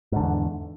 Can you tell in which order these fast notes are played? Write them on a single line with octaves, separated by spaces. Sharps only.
G#2 D3 E2